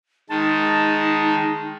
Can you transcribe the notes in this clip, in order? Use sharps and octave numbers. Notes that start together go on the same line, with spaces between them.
D#3 G#3 D#4 A5